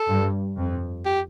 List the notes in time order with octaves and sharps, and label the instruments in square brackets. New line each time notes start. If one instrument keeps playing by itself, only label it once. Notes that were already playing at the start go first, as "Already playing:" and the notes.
Already playing: [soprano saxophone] A4
[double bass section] G2
F2
[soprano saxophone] G4